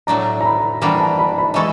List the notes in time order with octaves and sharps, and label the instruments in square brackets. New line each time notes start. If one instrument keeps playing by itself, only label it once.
[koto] A2 F#3 A3 D4 [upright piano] A#5
[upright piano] A#5
B5
[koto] E3 G3 A#3 D4 F#4 [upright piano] B5
[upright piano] A5
B5
B5
[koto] E3 G#3 E4 A4 [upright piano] C#6